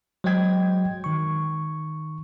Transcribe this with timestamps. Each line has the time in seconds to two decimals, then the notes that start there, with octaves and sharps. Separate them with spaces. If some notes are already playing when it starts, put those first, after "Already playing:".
0.24 F#3 G#3 C5 D#5 G5 G#6
1.04 D#3 C#6